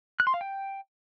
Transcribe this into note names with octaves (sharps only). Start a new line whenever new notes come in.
F#6
C6
F5
G5